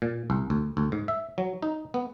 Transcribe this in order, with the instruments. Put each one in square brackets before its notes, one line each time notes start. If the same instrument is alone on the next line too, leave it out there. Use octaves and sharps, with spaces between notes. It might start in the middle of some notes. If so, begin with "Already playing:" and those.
[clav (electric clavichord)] A#2
C2
D2
D2
G#2
E5
F#3
D#4
B3